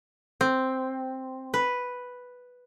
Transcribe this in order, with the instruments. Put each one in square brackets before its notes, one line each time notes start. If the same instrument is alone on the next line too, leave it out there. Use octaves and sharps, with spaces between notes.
[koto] C4
B4